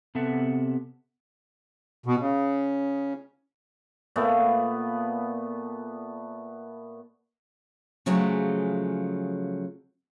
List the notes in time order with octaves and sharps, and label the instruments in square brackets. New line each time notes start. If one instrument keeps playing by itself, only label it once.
[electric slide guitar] C3 B3 A4 E5 F#5
[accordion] B2
C#3
[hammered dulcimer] A#2 A3 B3
[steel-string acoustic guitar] C#3 F3 F#3 G#3 A3